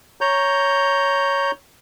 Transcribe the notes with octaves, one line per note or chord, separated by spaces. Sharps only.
C#5 A#5 G6